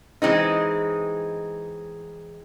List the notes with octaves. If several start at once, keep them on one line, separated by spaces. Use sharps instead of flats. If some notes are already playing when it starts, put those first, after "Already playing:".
E3 G#3 C4 D#4